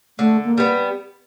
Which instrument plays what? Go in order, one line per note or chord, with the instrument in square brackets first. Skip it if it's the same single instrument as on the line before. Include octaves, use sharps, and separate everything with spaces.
[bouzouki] D3 [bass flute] A3
[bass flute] A#3
[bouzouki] G3 B3